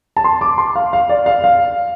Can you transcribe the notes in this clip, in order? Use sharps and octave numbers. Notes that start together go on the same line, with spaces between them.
A5
C6
D6
C6
F5
F5
D5
F5
F5